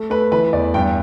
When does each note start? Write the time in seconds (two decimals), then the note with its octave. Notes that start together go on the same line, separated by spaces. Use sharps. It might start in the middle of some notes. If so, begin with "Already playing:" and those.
Already playing: A3
0.10 A3 B4
0.32 E3 B4
0.53 E2 D5
0.74 G2 G5